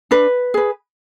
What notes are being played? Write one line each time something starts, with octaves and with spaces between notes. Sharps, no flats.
D4 B4
G#4 B4